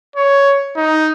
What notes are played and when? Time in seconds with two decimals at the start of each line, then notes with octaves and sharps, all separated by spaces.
0.16 C#5
0.76 D#4